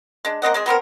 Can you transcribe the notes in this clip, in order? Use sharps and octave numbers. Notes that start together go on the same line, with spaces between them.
G#3 D4
A#3 C4 D#5 F#5
G#3 C4 G#4
F#3 B3 C4 A#4